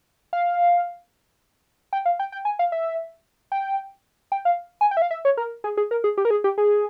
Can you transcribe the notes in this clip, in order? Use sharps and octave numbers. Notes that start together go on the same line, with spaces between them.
F5
G5
F5
G5
G5
G#5
F5
E5
G5
G5
F5
G#5
G5
E5
F5
E5
C#5
A#4
G#4
G#4
A#4
G#4
G4
A#4
G#4
G4
G#4